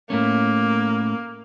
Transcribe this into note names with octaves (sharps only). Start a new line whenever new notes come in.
A2 A3 A#3 C#4